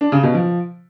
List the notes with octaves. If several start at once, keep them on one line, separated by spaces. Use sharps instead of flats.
D4
C#3
B2
F3